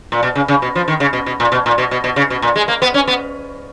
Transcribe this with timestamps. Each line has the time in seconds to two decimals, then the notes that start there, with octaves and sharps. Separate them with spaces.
0.12 A#2
0.23 B2
0.35 C#3
0.48 C#3
0.62 B2
0.75 F3
0.88 D#3
1.00 C#3
1.13 B2
1.26 B2
1.40 A#2
1.52 B2
1.66 A#2
1.78 B2
1.91 B2
2.04 B2
2.16 C#3
2.30 B2
2.42 A#2
2.56 G#3
2.68 A#3
2.82 B3
2.94 C#4
3.07 B3